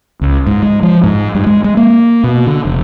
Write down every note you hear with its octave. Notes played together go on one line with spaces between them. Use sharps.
C#2
G#2
G#3
F3
G#2
G2
G#3
G#3
A#3
B2
D3
F1